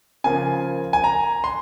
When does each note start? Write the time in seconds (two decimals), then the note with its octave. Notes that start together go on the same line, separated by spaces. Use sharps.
0.24 C#3 F3 A#3 F4 G#5
0.93 G#5
1.04 A#5
1.44 C6